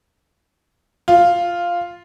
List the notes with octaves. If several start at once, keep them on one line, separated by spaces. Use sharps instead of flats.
F4